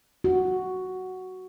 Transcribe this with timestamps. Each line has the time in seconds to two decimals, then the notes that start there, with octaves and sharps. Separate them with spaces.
0.24 F#4